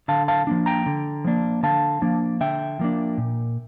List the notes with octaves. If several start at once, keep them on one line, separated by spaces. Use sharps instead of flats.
D3 F5 A5
F5 A5
F3 A#3 D4
G5 A#5
D3
F3 A#3 D4
D3 F5 A5
F3 A#3 D4
D3 E5 G5
F3 A#3 D4
A#2